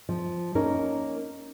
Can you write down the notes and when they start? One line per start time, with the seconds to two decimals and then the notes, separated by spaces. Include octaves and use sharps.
0.09 F3
0.55 A#3 C#4 D#4 A#4